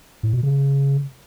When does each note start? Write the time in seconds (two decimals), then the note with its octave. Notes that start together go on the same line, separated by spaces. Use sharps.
0.23 A2
0.33 B2
0.43 C#3